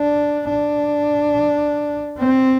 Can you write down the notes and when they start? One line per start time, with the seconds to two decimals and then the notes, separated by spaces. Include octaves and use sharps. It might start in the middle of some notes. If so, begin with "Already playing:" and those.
Already playing: D4
0.49 D4
2.18 C4